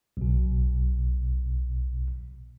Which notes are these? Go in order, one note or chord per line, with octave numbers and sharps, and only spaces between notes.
B1 B2